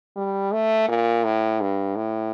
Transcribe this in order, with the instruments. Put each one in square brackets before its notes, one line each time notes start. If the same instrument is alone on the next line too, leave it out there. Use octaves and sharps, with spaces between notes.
[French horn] G3
A3
A#2
A2
G2
A2